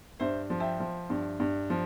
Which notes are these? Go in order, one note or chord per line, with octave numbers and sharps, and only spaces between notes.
G2 C5 E5
F3
E5 G5
F3
G2
G2
F3